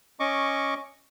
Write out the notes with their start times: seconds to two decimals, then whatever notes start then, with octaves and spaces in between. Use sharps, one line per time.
0.20 C#4 D#5 C#6 D6